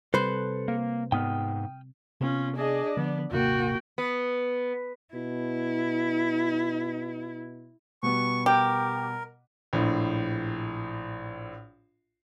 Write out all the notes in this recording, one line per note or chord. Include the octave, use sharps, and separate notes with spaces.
C3 G3 A4 B4 C5 F#6
A#3
G#2 B3 G5 D#6 F6
C3 B3 C#4 F4
D4 G#4 D5 D#5
D3 F3 B3
D#1 G#1 C3 A#3 F#4 G5
B3
B2 E4
B2 G3 B3 C#6
G4 A#4
A#1 A2